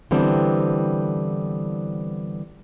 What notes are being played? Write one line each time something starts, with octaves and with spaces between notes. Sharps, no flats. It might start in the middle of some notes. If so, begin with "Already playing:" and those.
D3 E3 G3 B3 C4